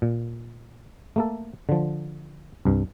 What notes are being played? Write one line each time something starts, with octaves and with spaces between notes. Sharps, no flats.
A#2
A3 A#3 A4
D3 F3
C2 G2